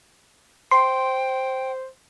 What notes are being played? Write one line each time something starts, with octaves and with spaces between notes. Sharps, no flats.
C5 G5 C6